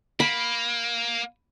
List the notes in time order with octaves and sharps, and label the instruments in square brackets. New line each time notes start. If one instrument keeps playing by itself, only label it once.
[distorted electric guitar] A#3 [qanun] B5